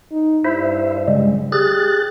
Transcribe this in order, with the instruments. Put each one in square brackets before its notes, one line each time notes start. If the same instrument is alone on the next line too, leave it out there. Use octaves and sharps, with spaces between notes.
[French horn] D#4
[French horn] G2 [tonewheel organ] E4 C5 E5
[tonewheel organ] C#3 G3 G#3
[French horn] G4 [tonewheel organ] G#4 F#6 A6